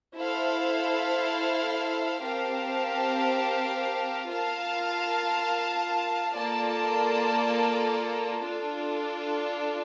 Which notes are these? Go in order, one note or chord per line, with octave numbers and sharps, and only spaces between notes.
E4 A4 C5 F5
C4 G4 A#4 F5 A5
F4 A#4 F5 A5
A#3 F4 A4 D5 A5
D4 F4 A4